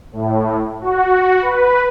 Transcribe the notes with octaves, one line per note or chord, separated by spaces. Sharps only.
A2
F#4
B4